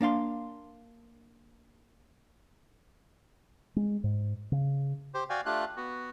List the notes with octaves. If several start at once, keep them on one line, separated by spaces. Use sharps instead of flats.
A#3 D4 F5 C6
G#3
G#2
C#3
G4 C5
F#4 D5 F5 G5 G#5
A3 D4 F4 G4 F#6
B3 F#4